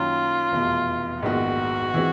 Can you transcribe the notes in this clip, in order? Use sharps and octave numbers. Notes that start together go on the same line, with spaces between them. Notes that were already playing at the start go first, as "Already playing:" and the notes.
Already playing: F#2 D#3 F#3 A#3 F4
F1 E2 B2
A#1 G#2 D#3 G#3 B3 F#4
E3 G#3 C4